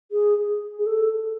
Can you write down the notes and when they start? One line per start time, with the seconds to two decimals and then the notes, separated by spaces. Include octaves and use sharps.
0.11 G#4
0.78 G#4
0.86 A4